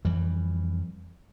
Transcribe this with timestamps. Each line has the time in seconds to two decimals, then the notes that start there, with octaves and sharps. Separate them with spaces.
0.05 F2 E3 G3